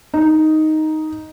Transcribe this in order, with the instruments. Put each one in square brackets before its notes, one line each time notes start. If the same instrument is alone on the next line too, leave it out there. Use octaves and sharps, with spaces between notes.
[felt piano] D#4